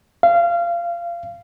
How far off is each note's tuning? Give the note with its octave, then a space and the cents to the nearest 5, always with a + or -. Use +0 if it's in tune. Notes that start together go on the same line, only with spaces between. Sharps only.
F5 -25